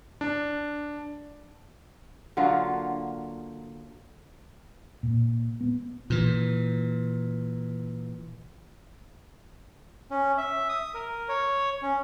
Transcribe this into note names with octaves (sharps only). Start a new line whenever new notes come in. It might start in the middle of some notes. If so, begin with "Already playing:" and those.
D4
D3 F#3 A#3 F4
A#2
B3
A#2 E3
C#4
E5
D#6
A#4
C#5
C#4